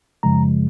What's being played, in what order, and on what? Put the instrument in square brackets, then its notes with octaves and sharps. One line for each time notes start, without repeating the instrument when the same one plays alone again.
[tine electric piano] F#2 C#3 F3 G#3 A#5